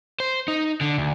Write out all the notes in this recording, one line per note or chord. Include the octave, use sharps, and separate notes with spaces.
C5
D#4
D3
D2